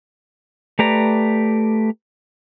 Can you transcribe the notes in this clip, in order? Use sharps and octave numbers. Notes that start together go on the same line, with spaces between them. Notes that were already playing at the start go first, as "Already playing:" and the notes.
A3 G4 B4 D5 A#5